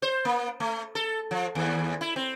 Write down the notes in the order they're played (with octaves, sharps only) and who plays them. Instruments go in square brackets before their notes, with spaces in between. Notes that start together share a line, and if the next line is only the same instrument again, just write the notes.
[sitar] C5
A#3
A3
A4
F3
D#2
E4
C4